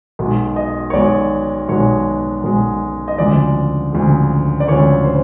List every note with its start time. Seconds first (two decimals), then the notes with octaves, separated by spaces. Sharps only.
0.19 B1 B2 G#3
0.56 D#5
0.90 C#5
0.94 B1 B2 G#3 D5
1.69 B1 B2 G#3 C#5
2.44 B1 B2 G#3
3.08 D#5
3.18 D2 C#3 F3 G#3 D5
3.93 D2 C#3 F3 G#3
4.60 D5
4.68 D2 C#3 F3 G#3 C#5
5.04 C5